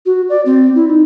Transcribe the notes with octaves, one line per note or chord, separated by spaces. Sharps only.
F#4
D5
C4
E4
D#4